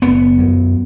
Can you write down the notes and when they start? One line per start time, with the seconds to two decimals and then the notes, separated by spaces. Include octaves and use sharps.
0.02 F#1 B3
0.38 F#2